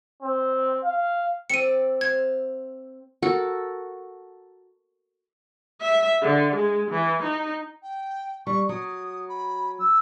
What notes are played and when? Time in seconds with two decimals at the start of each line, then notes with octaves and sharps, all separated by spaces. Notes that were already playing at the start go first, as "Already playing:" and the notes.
0.23 C4
0.84 F5
1.50 C4 A4 D5 C#7 D#7
2.01 C5 F5 G#6
3.22 F#4 A4 A#4
5.81 E5
6.22 D3
6.56 G#3
6.91 E3
7.23 D#4
7.83 G5
8.47 G3 C#6
8.69 F#3 D#6
9.29 B5
9.79 E6